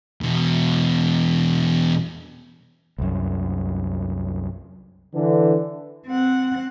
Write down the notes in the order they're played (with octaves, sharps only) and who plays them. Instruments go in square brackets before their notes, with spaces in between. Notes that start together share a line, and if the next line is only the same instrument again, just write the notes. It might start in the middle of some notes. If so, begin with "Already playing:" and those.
[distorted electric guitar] E2 B2
[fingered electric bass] C2 F#2
[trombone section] D3 E3
[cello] C4 F#5